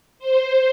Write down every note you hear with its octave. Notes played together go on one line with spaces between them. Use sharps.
C5